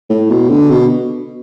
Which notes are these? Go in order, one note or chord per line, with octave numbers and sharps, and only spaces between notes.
A2
B2
D3
B2